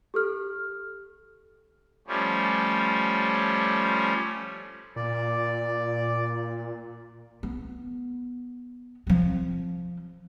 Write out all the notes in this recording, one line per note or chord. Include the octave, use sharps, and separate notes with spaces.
G4 A4 F6
F3 G3 A3 C#4
A#2 D5
B3
F3 C4